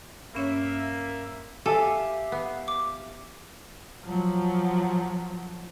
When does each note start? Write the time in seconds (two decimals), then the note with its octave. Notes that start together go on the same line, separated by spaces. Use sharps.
0.35 G2 A#3 C#4 C#5 E5
1.66 G4 A4 E5 F5 G#5
2.32 B3
2.68 D6
4.05 F3 F#3